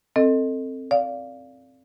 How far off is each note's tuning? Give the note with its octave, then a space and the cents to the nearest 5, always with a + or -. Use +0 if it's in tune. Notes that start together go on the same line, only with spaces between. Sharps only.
C4 +10 A4 +15 D#5 +0
D5 -15 F5 +0